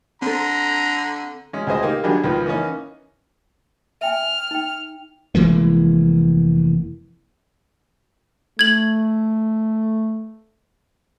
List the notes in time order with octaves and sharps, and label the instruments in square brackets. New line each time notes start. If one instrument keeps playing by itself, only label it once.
[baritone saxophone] D3 [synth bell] C4 A4 [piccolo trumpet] A#5
[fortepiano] G#3 C#4
C#2 G#4 C5 D#5
A#3 D#4 G4
D3 D#3 F#3 G3 D4 G#4
C#2 D#3 F3 B4
E3 A#3 B3 C#4 D#4
[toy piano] E5 G5 G#5 [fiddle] F6
[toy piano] D#4 G5
[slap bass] F1 E3 G#3 A#3
[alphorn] A3 [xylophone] G#6 F#7